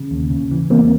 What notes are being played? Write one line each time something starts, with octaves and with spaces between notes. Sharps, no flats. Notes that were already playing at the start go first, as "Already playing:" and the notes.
Already playing: C#3
D#2
C#3
E3
E2 A#3 C4